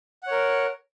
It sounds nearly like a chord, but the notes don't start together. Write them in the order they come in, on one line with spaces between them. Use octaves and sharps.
F#5 C#5 A#4